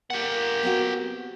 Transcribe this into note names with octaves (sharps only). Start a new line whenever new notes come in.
A#3 G4 F#5
B3 C4 F#4